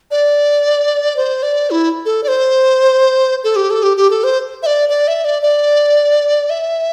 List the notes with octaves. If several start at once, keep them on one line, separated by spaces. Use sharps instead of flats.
D5
C5
D5
E4
A4
D5
C5
A4
G4
A4
G4
G4
A4
C5
E5
D5
D5
E5
D5
D5
E5